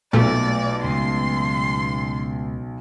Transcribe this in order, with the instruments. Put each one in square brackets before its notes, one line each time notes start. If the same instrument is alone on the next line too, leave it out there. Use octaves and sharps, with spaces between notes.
[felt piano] B1 [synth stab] A#2 A3 [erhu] D5
[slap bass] C#2 C#3 [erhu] C6